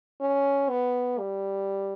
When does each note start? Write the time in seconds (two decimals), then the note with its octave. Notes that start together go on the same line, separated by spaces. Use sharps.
0.21 C#4
0.70 B3
1.19 G3